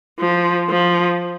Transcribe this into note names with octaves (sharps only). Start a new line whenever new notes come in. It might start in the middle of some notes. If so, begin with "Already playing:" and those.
F3
F3